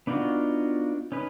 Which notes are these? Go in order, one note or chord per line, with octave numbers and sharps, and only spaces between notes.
B3 D4 D#4 F4 F#4
C#4 D#4 B4